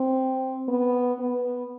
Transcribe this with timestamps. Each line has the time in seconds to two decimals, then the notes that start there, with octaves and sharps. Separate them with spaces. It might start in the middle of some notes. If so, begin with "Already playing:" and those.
Already playing: C4
0.68 B3
1.19 B3